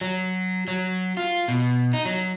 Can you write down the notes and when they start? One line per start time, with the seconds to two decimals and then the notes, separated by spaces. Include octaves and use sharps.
0.01 F#3
0.68 F#3
1.17 F4
1.48 B2
1.93 D#4
2.06 F#3